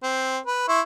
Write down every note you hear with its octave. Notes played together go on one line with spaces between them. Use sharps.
C4
B4
E4 C6 C#6